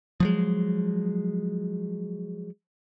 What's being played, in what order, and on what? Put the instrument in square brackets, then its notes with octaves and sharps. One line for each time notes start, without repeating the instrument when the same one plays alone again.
[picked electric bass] F3 F#3 G#3